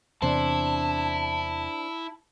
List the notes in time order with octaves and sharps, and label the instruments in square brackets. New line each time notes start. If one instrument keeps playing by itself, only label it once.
[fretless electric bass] E2 C3 [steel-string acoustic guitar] D4 C5 [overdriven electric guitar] E4 [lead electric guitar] A5